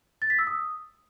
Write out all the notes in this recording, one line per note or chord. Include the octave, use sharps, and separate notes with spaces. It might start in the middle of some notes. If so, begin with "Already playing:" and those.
A6
B6
E6
D#6